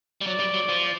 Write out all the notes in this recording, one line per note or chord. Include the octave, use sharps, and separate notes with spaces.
G3
F#3 D5
G3
F#3
F3